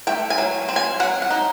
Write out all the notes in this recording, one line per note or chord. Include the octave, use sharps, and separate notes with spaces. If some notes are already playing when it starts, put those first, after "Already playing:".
A3 G5
G#5
F#3
C4
G#5
F#3 F#5
F#5
D#4